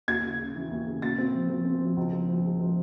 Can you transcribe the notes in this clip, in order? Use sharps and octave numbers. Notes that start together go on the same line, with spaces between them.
D#2 G#6
C#3
C#3
E3
D#2
C#3
A#2 A6
C4
F3
F3
C4
F3
C#2
F3
F3
G#3
F3